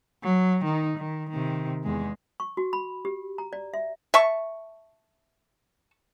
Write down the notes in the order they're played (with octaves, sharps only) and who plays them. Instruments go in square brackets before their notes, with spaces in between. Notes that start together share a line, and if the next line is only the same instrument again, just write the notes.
[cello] F#3
D#3 D#4
D#3
C3 D#3
E2 G#3
[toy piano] C#6
F#4
B5
G4
A#5
D5
E5
[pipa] E5 A5 C#6